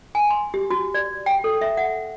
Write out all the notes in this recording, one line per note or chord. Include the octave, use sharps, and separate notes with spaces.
G#5
C6
G4
F#4
D5
G5
A4
E5
F#5